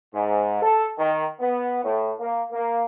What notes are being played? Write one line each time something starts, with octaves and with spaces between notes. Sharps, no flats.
G#2
A4
D#3
B3
A2
A#3
A#3